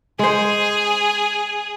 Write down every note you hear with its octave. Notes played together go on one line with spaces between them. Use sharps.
G#3 G#4 C5